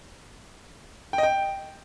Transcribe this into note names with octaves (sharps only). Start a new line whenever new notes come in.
G5
D#5
G5